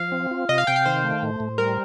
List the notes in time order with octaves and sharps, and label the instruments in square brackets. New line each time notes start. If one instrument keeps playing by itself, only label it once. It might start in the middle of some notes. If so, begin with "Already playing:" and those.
Already playing: [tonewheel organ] F3 [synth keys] F5
[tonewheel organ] C4
F4
[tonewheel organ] C3 [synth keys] D#5
[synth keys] F5
[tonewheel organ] C3 [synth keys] G5
[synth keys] F5
[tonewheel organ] D#3 [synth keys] C5
[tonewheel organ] A3
A2
A2
[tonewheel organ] G3 [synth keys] A#4